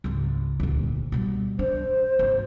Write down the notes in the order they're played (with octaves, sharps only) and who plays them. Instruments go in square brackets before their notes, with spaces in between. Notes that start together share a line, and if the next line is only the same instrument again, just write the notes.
[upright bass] G#1 C#2
D#1 D2
B2 G3
[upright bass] D4 [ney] C5
[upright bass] G#1